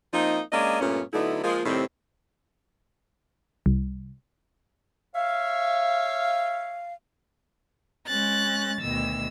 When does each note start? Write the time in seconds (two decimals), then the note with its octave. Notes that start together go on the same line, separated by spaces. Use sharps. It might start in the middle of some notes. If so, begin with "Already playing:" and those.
0.14 F3 A#3 C4 D#4
0.52 G#3 A#3 C#4 D4 D5 D#5
0.81 G2 A#2 A3 B3 C#4
1.13 D3 F#3 A3 B3 D#4 E4
1.43 F3 G#3 A#3
1.66 A2 C3 D#3 G3 C4
3.66 C2
5.15 C#5 E5 F5
8.07 G#3 C#4 F#6 A6
8.81 D2 B2 D#3 E6